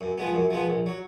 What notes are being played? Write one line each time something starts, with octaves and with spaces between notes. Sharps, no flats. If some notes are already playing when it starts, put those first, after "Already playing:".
F#2
F3 G#3 B3
F#2
F3 G#3 B3
A#1
F#3